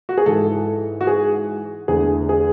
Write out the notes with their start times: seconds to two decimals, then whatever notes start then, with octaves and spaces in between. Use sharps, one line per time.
0.09 F#4
0.18 G#4
0.26 G#2 E3 G#3 A4
1.01 F#4
1.07 G#4
1.88 E2 D3 A3 G#4
2.29 G#4